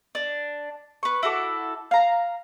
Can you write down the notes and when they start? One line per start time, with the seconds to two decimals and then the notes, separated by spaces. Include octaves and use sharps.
0.15 D4
1.03 B4 C#6
1.23 E4 F#4 A4 D6
1.91 F5 A#5